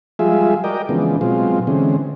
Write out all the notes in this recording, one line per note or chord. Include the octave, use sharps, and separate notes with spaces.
F3 G3 G#3 F4 G#4 E5
F#4 A#4 D5 D#5 G5
C#3 E3 F3 G#3 B3 D4
B2 F#3 G#3 C4 F4
D3 E3 G#3 C4 C#4